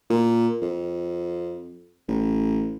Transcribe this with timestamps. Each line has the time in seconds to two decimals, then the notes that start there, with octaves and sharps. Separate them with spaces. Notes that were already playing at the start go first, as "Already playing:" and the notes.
0.10 A#2
0.62 F2
2.08 A1